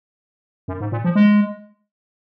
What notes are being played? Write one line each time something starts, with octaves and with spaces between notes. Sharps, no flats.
F#2
G#2
A#2
F3
G#3